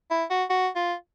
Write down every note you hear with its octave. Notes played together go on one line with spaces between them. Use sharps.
E4
F#4
F#4
F4